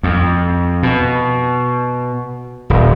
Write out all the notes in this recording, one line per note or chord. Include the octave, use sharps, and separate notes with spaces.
F2
B2
D#1